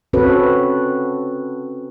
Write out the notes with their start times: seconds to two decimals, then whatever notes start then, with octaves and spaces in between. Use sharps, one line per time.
0.13 C4 C#4 F#4 A4 B4 C#5